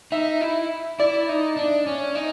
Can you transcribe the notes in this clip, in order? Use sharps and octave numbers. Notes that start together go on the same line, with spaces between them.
D#4 E5
E4
E4 D5
D#4
D4
C#4
D#4